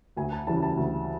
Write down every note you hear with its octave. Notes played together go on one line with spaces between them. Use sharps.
D2 G#5
A5
C#3 E3 G3 A5
A5
D2